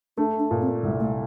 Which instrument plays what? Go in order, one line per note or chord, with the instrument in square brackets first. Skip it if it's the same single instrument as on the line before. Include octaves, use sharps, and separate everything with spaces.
[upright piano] A3 [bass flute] D4
[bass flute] D4
[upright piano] A#2
[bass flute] C4
[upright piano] C2 [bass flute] G#3
[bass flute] A3